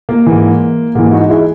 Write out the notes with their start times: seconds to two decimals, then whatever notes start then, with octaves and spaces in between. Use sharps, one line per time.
0.09 A#3
0.26 G#2 E3
0.95 G#2 E3 A#3
1.12 D#4 F#4
1.30 E4 G#4